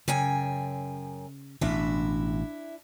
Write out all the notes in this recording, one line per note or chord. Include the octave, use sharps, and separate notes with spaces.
F#2 C#3 G5 G#5
A1 B2 D4 E4 E5